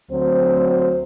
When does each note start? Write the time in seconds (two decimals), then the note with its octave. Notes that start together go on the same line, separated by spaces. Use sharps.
0.11 D2 F#3 C4 C5